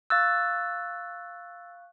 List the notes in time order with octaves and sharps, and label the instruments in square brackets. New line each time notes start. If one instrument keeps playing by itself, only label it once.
[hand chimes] F5 C#6 F#6 [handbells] E6 A6